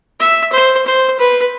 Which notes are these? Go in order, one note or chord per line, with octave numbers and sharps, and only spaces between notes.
E5
C5
C5
B4